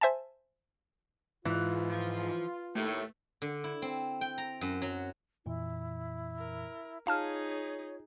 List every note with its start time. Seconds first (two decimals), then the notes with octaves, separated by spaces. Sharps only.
0.01 C5 E5 G#5 A5
1.45 G#2 E3 F4
1.88 F3
2.75 D#2 A2 A3
3.42 D3
3.64 E4
3.82 C4
4.21 G5
4.38 A#5
4.61 F#2
4.82 F#3
5.46 F2 A#2 E3 E4
6.38 A#4
7.07 D#4 F4 G#4 C#5 F5 A5 F6